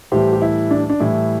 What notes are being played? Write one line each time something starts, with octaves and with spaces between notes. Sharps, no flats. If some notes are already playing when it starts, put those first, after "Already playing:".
A2 E3 G3 G4 C5
G4
E4
D4
D4
A2 E3 G3 E4